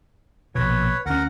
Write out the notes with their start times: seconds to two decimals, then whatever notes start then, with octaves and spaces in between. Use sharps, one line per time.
0.55 A#1 B2 B4 C#5
1.06 D2 C#4 A#4 F#5